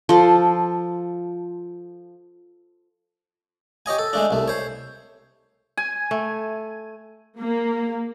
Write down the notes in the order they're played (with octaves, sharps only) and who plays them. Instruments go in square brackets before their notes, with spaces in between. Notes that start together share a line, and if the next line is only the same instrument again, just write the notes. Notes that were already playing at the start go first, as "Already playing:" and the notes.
[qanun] F3 A4
[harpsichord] G4 C#5 D#5 G#5
A4
G#3 A3 D4
C2 A3
C5 C#5
[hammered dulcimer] G#5
[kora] A3
[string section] A#3